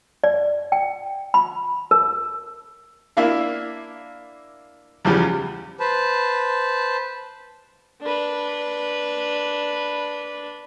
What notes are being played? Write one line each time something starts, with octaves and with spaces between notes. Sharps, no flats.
D5
G5
B5
A#4
A#3 D4 E4 E5 F5
E2 C#3 F3 G3
B4 C5 A5
D4 B4